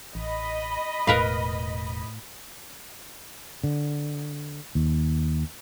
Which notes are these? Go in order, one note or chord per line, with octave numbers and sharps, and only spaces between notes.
A1 D#5 B5
E1 A2 A#4 B4 F5
D3
D#2